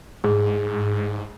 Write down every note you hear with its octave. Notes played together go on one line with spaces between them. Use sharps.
G#2 G#4